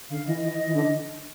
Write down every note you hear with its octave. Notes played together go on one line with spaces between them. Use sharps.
D3 F5
E3 D#5
E3 D#5
D#5
E3
D3 D#5